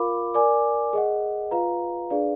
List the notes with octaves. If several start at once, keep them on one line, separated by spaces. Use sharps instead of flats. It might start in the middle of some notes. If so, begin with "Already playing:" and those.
Already playing: F4 A#4 F5 B5 D6
A#4 D5 G#5 D6
G#4 D#5 F#5
F4 B4 F5 A#5
D4 G#4 B4 D5 F5